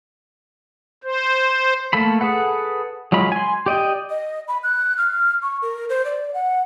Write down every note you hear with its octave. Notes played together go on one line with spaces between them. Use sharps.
C5
A3 A#3 A4 B5
G#4 A4 B4 F#5
F#3 G#3 F4 B5
G#5 C6
G4 D5 D#5 G5
D#5
B5
F#6
F6
C#6
A#4
C5
D5
F#5